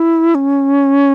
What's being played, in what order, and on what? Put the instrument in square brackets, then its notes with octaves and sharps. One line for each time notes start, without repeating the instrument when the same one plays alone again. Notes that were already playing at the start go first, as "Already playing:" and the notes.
Already playing: [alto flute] E4
C#4